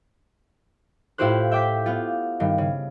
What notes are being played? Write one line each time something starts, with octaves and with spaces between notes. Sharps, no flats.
A2 E4 F4 G4 C5 F#6
E5 G5 D6 G6 B6
B3 F4
G2 D#3
C#3